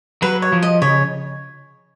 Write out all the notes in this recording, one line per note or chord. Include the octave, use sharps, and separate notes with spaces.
F#3 B4
C#5
F3
D#5
C#3 C#5